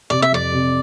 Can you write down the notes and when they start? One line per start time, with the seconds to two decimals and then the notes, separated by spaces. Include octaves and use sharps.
0.10 C3 D5
0.22 E5
0.32 F2 D5
0.53 C3